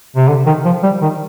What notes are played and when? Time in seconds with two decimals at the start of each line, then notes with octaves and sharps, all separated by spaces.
0.16 C3
0.28 D3
0.46 D#3
0.65 F3
0.83 G3
1.02 D#3